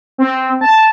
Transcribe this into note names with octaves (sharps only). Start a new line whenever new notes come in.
C4
A5